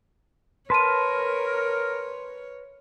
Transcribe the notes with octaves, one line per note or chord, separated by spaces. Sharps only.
A#4 B4 C#5 A5 C6 D#7